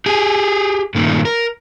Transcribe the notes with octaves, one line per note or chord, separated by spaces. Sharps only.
G4 G#4 G#5
G2 A#2 D#3 A3
A#4